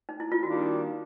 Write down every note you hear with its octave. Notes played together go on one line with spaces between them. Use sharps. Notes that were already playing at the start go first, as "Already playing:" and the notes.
D#4
E4
F4
D#3 G3 A#3 D4 F#4